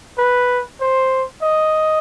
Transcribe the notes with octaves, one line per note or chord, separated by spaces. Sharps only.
B4
C5
D#5